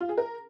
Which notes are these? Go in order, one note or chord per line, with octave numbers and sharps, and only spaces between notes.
F4
G#4
A#4